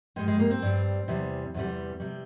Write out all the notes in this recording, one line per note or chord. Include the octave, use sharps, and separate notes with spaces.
G2 G3 G#3
G#3
A#3
C4
G2 G3
E2 C3 E3 G3
E2 C3 E3 G3
C3 G3